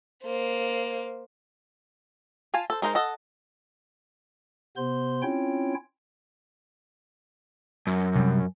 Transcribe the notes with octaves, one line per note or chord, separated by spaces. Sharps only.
A#3 C5
F4 F5 G#5 A5
A4 C5
G#3 D#4 A#4 C5
A4 D#5 F#5
C3 B3 C5 C6
C4 C#4 E4 F4 C#5 G5
F#2
C3 G3